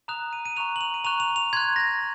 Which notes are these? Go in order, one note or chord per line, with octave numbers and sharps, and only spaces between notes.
A#5 D#6 F#6 F7
D#7
D#7
A#5 C#6 F#6 F7
F#7
F7
D#7
A#5 C#6 F#6 F7
F7
F7
C6 F#6 G#6
A#6